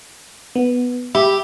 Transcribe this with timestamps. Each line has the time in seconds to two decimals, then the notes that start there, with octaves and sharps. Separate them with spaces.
0.55 B3
1.15 G4 E5 B5